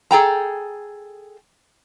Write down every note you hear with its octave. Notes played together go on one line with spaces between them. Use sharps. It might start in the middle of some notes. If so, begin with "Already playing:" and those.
G#4 A4 G5 A#5